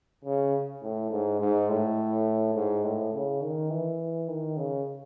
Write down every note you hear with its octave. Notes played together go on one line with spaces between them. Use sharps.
C#3
A2
G#2
G#2
A2
G#2
A2
C#3
D#3
E3
D#3
C#3